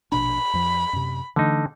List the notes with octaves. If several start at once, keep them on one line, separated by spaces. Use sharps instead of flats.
A#1 B2 D4 B5
F2 F3
F#2 C3
D3 E3 A3 D#4